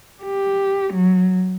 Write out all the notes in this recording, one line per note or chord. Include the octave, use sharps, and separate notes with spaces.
G4
F#3